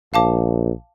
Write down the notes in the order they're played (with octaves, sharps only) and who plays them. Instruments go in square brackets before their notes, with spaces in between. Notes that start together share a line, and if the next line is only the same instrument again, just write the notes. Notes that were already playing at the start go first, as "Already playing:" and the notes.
[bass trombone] A#1 [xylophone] F5 A5 D6